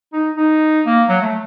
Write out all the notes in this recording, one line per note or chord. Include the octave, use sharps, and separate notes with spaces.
D#4
D#4
A#3
F#3
A3